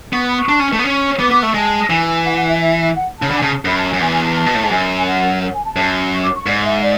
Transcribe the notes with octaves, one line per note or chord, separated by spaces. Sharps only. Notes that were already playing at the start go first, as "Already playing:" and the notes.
B3 C#6
B5
C#6
D4
C#4
A3
B3
C#4
B3 D6
B3 D6
A3 C#6
G#3 A5
E3 G#5
F#5
F#5
E5
E5
F#5
C#3 A5
D3 B5
G#5
C#3 A5
A5
F#2 B5
A5
G#5
F#2
E2 G#5
G#5
A5
A5
B2
A2
G#2
F#2 G#5
F#5
F#5
G#5
A5
F#2
C#6
D6
C#6
G#2 D5
D5
E5
D5